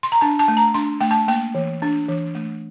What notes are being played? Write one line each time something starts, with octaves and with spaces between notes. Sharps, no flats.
C6
A#5
D4 A5
A5
A3
A#5
D4 C6
A3 G5
A5
A#3 G5
E3
D4
E3
A3